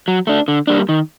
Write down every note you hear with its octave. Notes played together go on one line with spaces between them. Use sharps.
F#3
A3 D4
D3
G3 A#3 D4
D#3